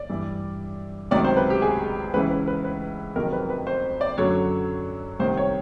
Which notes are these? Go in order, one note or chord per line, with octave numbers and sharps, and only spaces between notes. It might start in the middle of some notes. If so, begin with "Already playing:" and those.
Already playing: D5
G2 E3
C#2 C3 D#3 F#3 D5
C5
B4
G4
G#4
C#2 C#3 E3 B4
B4
B4
B4
F2 C3 D#3 F#3 A#4
B4
B4
C5
D5
F#2 D3 F#3 C#5
C2 C3 D#3 C5
C#5